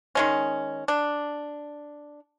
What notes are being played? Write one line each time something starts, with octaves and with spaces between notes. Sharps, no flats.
D#3 G#3 C#4
D4